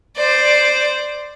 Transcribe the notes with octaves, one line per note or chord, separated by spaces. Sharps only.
C5 D5